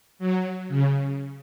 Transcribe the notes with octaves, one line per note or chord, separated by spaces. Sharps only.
F#3
C#3